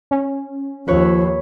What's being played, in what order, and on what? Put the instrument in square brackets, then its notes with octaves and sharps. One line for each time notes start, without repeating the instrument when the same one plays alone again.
[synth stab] C#4
[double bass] D#2 [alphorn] F3 [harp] B4 C#5